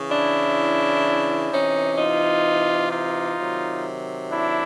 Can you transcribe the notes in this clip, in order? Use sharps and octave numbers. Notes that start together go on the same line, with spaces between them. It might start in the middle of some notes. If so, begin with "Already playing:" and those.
Already playing: C#3 E3
D4 E4
C3 E3 C#4 D#4
D#4 F4
D#4 F4
C3 D#3 F#3
D4 E4